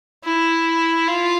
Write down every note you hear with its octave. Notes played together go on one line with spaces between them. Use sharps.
E4
F4